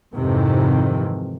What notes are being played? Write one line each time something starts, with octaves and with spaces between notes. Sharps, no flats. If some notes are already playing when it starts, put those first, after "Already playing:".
F2 G#2 C3 D#3 E3